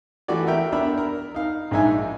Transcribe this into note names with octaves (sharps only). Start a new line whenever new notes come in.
E3 A3 F#4 G4 D5
A#4 E5 G5
B3 D4 A#4 E5 B5
A#4
D#4 F5
A#1 G#2 G#3 D#4 E5 G#5